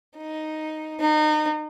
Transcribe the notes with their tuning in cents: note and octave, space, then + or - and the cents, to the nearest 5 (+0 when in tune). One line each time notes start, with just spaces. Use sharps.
D#4 +0
D#4 -30